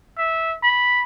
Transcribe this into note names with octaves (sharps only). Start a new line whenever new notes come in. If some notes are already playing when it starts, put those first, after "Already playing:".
E5
B5